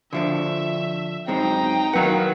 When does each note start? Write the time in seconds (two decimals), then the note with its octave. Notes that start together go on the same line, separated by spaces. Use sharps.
0.13 D3 F3 D4 E5
1.28 F#2 G#3 C4 D#4 G5 A#5
1.93 D#3 F#3 B4 F5 F#5